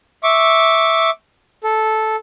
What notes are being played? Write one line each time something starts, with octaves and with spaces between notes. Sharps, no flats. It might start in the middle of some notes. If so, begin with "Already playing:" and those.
E5 C#6 D6
A4